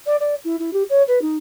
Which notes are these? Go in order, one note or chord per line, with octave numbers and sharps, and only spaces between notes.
D5
D5
E4
E4
G4
C#5
B4
D#4